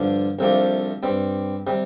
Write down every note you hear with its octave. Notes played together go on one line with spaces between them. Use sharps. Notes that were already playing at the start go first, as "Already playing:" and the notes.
Already playing: G2 D3 F3 D4
C2 C3 F3 A3 D4
G2 G3 C4
C3 G3